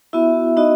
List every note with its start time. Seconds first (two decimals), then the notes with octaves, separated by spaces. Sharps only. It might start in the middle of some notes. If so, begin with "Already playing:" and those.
0.13 B3 E4 F#4 E5
0.57 B3 D#4 F#4 D#5